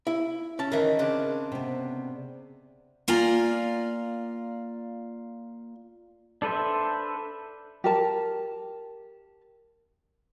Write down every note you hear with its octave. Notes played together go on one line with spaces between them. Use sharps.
E4
C#4 A5
D#3 E3 A#4 D#5 E5
C#3 C4 D4
C3 B3
A#3 F4 D5 G#5 A#5
D4 A4 B4 C5 E5
G4 A#4 A5